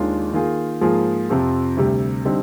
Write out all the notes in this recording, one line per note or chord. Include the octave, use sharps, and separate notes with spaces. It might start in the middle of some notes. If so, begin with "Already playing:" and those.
Already playing: D#2 D#3 G#3 D4 F4
D#3 A#3 F4 G#4
G#2 F3 A#3 F4 G#4
F2 C3 F3 C4 F4
D2 C3 G3
D3 G3 C4 D#4